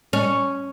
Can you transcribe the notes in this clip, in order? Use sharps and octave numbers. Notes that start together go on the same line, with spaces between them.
C#4